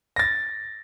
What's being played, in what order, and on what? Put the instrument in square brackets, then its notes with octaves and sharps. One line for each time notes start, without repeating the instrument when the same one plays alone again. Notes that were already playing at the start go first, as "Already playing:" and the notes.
[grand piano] A6 A#6